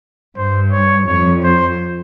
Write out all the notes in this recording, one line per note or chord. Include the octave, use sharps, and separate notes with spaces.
G2 C5
C#5
F2 C#5
C5